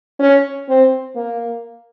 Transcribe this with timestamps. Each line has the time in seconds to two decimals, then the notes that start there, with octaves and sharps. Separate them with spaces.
0.19 C#4
0.69 C4
1.16 A#3